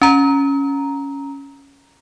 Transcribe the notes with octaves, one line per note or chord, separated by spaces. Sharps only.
C#4 A#5